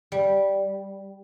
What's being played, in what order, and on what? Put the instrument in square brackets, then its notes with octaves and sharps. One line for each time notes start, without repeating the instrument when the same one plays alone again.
[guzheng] G3